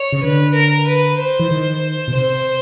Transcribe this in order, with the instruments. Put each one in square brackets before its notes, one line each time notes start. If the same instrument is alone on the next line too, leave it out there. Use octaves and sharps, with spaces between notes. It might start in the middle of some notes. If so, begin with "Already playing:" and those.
Already playing: [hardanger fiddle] C#5
[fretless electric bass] C#3
[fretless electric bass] D3 [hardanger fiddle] B4
[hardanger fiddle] A#4
B4
C5
[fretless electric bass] E3
D#3
B2
[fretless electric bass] C3 [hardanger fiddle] C5